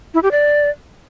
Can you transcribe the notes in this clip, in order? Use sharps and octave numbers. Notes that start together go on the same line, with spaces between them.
E4
G4
D5